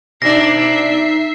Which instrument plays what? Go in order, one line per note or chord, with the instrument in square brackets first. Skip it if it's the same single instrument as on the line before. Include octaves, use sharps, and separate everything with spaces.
[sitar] B2 D4 [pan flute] D#4 [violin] E5 C7 [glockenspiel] A#6